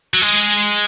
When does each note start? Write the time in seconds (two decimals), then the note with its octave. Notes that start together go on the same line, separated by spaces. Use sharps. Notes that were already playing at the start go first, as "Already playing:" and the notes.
0.14 F#3
0.21 G#3